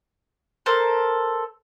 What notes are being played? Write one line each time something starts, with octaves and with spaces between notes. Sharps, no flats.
A4 A#4 C5